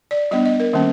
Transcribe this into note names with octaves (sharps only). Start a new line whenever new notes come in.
D5
G3 B3 D4 D#5
D#5
A#4
D#3 G3 A#3 C#4